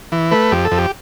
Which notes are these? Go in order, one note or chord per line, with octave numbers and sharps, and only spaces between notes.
E3
A3 B4
F2 G4
A4
F2
G4